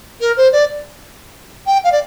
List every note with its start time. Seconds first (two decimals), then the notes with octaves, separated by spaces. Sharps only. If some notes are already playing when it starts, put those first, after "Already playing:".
0.20 A#4
0.37 C5
0.52 D5
1.66 G5
1.84 F5
1.92 D5